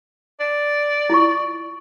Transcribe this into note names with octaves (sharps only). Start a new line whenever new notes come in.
D5
E4 F4 C#6